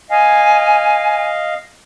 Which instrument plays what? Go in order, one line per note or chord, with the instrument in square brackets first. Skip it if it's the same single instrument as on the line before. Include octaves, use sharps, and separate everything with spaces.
[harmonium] D#5 F5 [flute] G#5